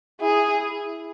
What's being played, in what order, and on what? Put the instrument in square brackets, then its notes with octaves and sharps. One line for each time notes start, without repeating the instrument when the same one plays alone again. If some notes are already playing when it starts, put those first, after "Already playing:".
[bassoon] E4 [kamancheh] G#4